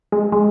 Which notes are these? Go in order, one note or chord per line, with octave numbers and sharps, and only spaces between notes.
G#3
G#3